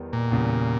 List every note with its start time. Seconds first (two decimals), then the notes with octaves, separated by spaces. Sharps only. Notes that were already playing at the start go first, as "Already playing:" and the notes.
Already playing: E2 D#3 G3 B3
0.13 A#2
0.32 E2 C#3 G3